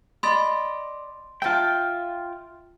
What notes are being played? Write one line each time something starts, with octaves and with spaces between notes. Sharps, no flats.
D5 D#5 B5 C6 A6
F4 E5 G5 A5